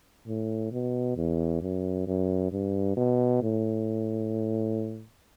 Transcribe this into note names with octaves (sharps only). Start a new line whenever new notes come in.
A2
B2
E2
F#2
F#2
G2
B2
A2